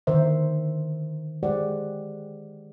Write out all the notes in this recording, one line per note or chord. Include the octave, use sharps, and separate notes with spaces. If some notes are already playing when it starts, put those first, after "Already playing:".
D3 D#3 A#4 C5 E5
G#3 G4 C5 D5 F#5